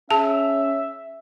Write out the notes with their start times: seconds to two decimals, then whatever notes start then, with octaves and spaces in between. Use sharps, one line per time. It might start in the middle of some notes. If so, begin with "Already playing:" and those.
0.11 C#4 G#4 E5 A5